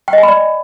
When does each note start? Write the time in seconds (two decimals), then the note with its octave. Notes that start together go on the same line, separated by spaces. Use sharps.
0.08 G5
0.13 D#5
0.18 G#5
0.23 B5
0.28 D5